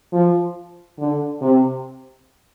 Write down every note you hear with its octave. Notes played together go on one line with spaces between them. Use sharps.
F3
D3
C3